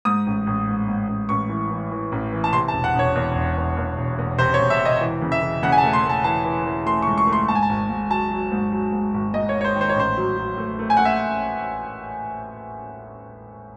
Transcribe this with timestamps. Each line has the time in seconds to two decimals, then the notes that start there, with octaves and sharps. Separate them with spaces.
0.05 G#2 D#6
0.26 A1
0.47 A1
0.68 G#2
0.88 G#2
1.08 A1
1.29 A1 C#6
1.49 E3
1.70 E3
1.91 E3
2.12 A1
2.32 E3
2.44 A5
2.53 C3 C6
2.68 A5
2.73 E1
2.84 F#5
2.95 E1 C#5
3.15 E2
3.35 E1
3.57 E2
3.77 E2
3.98 E1
4.18 E2
4.38 C3 C5
4.54 C#5
4.59 E1
4.70 E5
4.79 C3
4.85 D#5
5.01 E3
5.22 C#3
5.32 E5
5.41 E3
5.63 C#3 F#5
5.72 G#5
5.78 A5
5.84 A3
5.93 C6
6.03 A3
6.09 A5
6.24 E3 A5
6.45 E3
6.65 E3
6.86 A3 C6
7.02 C#6
7.07 C#2
7.18 C#6
7.27 A3
7.33 C6
7.48 G#2 A5
7.55 G#5
7.63 A5
7.69 G#1
7.89 G#2
8.10 F#3 A5
8.31 F#3
8.51 G#2
8.72 F#3
8.92 G#2
9.14 G#1
9.34 G#2 D#5
9.49 C#5
9.54 G#2
9.61 C#5
9.64 C5
9.75 D#3
9.81 C5
9.89 C#5
9.96 A1 C5
10.17 F#3
10.37 F#3
10.58 A3
10.79 A3
10.90 G#5
10.97 A3 F#5
11.05 E5